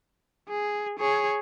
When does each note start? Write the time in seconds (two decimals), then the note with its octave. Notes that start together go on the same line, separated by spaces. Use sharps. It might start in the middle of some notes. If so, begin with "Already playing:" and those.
0.49 G#4
0.99 G#4 C#5